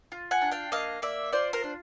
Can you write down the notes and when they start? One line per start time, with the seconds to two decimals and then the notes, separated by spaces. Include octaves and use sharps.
0.12 F4
0.31 F#5 G#5
0.41 D4
0.51 F5 G5
0.72 A#3 D#5 F5
1.02 A#3 D5 E5
1.33 F4 C5 D5
1.53 A#4 C5
1.64 D4